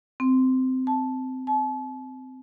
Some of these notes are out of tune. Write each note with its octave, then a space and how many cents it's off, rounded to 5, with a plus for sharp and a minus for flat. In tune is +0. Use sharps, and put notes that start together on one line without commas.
C4 -15
A5 -10
A5 -40